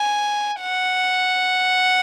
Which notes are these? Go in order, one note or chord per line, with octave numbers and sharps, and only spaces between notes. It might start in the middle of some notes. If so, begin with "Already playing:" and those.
Already playing: G#5
F#5